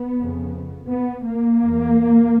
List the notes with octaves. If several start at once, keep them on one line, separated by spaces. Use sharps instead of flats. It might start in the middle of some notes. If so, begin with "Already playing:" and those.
Already playing: B3
F2 C#3
B3
A#3
E2